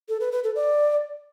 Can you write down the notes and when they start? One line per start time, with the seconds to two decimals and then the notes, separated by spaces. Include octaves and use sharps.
0.09 A4
0.20 B4
0.32 B4
0.44 A4
0.55 D5